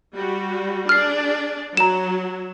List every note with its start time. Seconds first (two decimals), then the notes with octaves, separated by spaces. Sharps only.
0.13 G3 F#4
0.89 D4 G#4 D5 F6 C7
1.77 F#3 A#5 E7